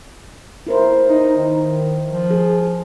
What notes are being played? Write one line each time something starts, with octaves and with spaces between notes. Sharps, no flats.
E4 A#4 C5
D#4
D#3
F3
G#4